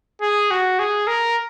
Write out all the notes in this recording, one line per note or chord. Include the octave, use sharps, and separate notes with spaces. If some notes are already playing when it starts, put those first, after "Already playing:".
G#4
F#4
G#4
A#4